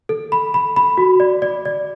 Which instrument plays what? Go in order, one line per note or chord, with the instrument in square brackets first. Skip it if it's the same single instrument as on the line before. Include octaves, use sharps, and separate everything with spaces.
[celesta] A4
B5
B5
B5
F#4
D5
D5
D5